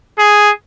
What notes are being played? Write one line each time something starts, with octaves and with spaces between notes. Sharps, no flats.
G#4